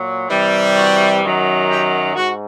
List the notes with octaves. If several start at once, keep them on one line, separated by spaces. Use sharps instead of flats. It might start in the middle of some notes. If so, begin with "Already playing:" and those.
Already playing: A#2 F#3
C3 E3 G3
F#4
F#2 D#3 F#3
G4
G#2 F#4